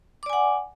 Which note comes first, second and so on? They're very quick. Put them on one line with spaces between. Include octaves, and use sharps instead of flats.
D6 D5 G#5 F#5